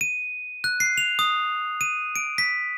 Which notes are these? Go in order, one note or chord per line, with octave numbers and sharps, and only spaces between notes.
D#7
F#6
C7
F7
D#6
D#7
D7
B6